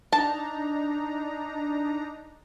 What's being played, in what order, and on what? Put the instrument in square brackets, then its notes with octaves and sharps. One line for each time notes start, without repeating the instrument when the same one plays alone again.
[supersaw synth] D4 D#4 A#5 [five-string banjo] A5